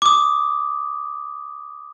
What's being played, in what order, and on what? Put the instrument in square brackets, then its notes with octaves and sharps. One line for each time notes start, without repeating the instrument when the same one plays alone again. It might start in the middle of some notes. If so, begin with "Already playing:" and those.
[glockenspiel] D6 D#6